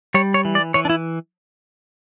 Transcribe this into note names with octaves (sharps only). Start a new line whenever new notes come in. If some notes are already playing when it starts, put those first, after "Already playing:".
G3 C#5
C#5
E3
D5
E3 C#5
D4
E4